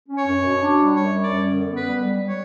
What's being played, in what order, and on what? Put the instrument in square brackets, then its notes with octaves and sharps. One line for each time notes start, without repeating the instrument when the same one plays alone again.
[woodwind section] C#4
[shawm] C#5
[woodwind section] F#2
B2
D4
G3
[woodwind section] F#2 [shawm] C#5
[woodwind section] G3
[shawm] D5
[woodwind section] F#2
D3
B3
[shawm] B4
[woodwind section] G3
G3
G3
[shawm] C#5